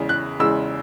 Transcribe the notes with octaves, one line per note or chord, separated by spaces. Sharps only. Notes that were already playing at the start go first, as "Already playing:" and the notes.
Already playing: E2 C#3 G#3
F#6
E2 C#3 G#3 E6